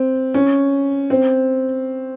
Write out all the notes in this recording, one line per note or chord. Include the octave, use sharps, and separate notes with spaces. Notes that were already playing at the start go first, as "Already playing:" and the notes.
Already playing: C4
C#4
C4